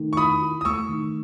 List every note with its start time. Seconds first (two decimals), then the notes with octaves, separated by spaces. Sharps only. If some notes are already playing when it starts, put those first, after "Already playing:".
Already playing: D#3 A3
0.13 C#6
0.17 E4 B5 D#6
0.41 E4
0.61 D#6
0.65 A3 C#6 E6
0.89 D#3